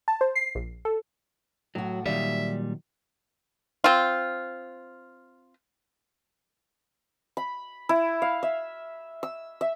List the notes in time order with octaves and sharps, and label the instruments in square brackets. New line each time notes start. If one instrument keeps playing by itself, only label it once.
[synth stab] A5
C5
C7
A#1
A4
[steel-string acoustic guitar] A2 F#4 [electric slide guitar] F#3
[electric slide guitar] A#2 G3 [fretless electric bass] D#3 F#3 [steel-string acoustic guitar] D5 F5 [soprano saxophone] E5
[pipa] C4 F4
[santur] B5
E4
F5
E5
E6
E5